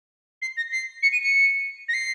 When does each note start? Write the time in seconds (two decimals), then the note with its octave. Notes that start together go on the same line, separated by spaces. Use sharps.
0.42 C7
0.57 A#6
0.71 C7
1.02 C#7
1.12 D#7
1.23 C#7
1.88 A#6
1.93 C7